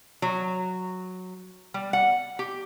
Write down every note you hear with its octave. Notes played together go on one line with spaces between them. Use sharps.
F#3
G3
F#5
G4